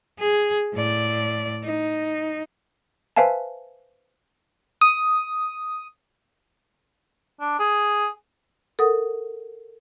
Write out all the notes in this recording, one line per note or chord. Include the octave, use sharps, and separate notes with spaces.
G#4
A2 D5
D#4
B4 C5 E5 F5 G#5 A5
D#6
D4
G#4
A4 A#4 F#5 D#6